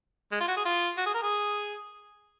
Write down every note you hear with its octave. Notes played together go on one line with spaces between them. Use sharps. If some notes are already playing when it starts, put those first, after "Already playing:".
G#3
F4
F#4
G#4
F4
F#4
G#4
A#4
G#4